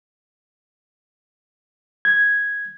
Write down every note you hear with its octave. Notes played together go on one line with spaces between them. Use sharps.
G#6